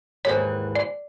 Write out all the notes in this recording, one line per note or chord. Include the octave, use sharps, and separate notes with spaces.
D#2 G#2 E3 C#5
D5